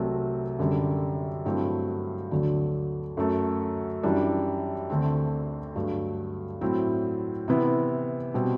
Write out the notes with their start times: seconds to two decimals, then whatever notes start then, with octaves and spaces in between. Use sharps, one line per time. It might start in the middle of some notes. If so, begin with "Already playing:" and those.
Already playing: C2 C3 F#3 A3
0.59 F#2 D3 G3
1.45 G2 F#3 A3 C4 E4
2.31 D2 D3 F#3
3.17 F#2 F#3 A3
4.03 F#2 E3 G3 D4
4.90 D2 D3 A3 C4
5.76 G2 F#3 A3
6.61 A2 F#3 C4 E4
7.48 C3 E3 B3 E4
8.34 B2 G3 C4